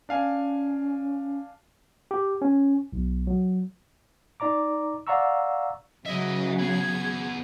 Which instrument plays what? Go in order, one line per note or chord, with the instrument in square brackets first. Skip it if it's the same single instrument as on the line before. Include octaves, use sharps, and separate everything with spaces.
[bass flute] C#4 [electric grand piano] D4 F5 G#5
[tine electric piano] G4
C#4
B1
F#3
D#4 D5 A#5 D6
D5 F5 F#5 A#5 C#6 E6
[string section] C#3 F#3 [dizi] D#5 [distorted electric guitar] E5 G#5
[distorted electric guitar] B3 G#4 [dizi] G#6